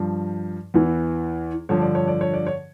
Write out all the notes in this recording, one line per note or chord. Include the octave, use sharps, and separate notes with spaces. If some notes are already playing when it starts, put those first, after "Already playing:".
Already playing: G2 F3
E2 E3
G2 D3 F3 C#5
D5
C#5
D5
C#5
D5
C#5